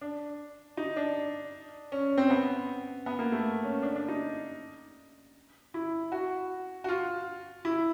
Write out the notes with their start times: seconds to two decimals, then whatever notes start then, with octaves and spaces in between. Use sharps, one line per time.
0.01 D4
0.77 D#4
0.96 D4
1.92 C#4
2.18 C4
2.30 B3
3.06 B3
3.19 A#3
3.32 A3
3.64 C#4
3.82 D4
3.95 D4
4.08 D#4
5.74 E4
6.12 F#4
6.84 F#4
6.88 F4
7.65 E4